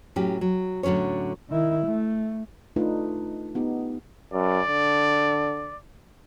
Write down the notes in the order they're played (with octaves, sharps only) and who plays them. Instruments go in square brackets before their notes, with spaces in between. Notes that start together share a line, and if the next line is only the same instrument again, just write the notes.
[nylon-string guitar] A2 F#3 C#4 G4
F#3
A2 D3 F#3 C#4 C#5
[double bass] D#3 E4
A3
[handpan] A3 D4 D#4 F4 B4
B3 D#4 G4
[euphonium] F#2 [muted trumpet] D5
[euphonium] D3